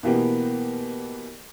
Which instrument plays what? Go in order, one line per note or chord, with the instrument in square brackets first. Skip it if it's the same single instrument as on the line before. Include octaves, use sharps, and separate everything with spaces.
[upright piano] B2 E3 A#3 B3 G4